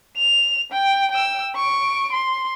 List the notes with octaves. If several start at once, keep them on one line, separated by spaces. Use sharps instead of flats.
F7
G5
G5 E6
C#6 D7
C6